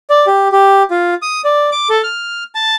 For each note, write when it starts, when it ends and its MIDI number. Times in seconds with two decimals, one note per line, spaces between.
0.10 0.26 74
0.27 0.48 67
0.52 0.83 67
0.90 1.14 65
1.22 1.41 87
1.45 1.70 74
1.72 1.88 86
1.90 2.02 69
2.03 2.44 89
2.55 2.76 81